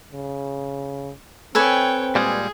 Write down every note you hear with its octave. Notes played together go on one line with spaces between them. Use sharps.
C#3
C4 A4 B4 C#5 G5 G#5
A#2 G3 G#3 G#4